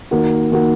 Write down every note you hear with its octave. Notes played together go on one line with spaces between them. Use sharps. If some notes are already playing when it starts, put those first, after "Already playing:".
D#3 A#3 F#4
D#3 A#3 F#4